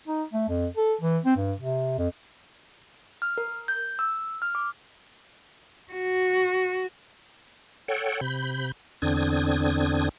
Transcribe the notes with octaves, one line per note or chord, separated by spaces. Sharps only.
D#4
A3
F2
A4
E3
C4
G2
C3
F2
F6
A#4
G6
E6
F6
D6
F#4
A4 C#5 F#5 G5
C3 B5 G6
E2 D3 C4 D4 D#6 G#6